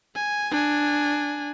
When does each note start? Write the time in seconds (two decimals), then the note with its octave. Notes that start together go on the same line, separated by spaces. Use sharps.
0.15 G#5
0.51 D4 G#5